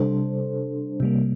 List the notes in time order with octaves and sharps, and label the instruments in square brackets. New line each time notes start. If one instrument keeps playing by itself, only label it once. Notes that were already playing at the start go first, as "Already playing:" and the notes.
Already playing: [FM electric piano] C3 G3 D4 A4 C5
C3 G3 A#3